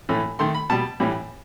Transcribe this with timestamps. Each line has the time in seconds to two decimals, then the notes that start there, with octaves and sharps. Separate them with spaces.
0.09 A2 E3 A3
0.39 D#3 A3 C6
0.55 B5
0.70 B2 G3 A5
1.00 A2 E3 G3